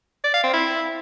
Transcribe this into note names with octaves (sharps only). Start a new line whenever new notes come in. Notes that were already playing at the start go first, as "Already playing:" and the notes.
D5
F5
C4
E4